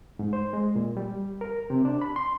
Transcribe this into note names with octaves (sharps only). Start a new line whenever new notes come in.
G#2
C5
G#3
A#2
G3
A#4
C3
D4
B5
C6